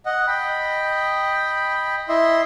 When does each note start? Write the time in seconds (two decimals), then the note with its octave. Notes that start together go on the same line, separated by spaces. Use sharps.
0.06 D#5 F#5
0.27 D#5 G5 B5
2.09 E4 D#5 E5 C6